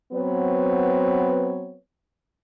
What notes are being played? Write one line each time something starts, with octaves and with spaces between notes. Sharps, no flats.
F#3 B3 C4 B4 C#5